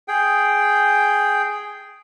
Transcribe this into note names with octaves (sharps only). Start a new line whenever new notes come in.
G#4 G5